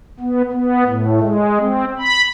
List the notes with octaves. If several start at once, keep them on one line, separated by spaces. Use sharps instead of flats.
B3
B3
A2
G#3
C4
B5